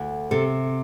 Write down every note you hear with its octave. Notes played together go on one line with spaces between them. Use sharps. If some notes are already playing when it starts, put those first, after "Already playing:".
Already playing: D2
C3 A4